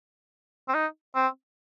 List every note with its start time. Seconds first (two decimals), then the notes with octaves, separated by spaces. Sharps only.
0.68 C4
0.74 D#4
1.15 C4